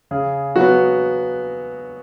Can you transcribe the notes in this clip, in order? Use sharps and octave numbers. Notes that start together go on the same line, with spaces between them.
C#3 G#4
F#3 B3 F#4